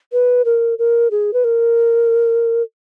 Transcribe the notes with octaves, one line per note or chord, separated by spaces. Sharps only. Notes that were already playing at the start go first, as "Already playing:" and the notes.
B4
A#4
A#4
G#4
B4
A#4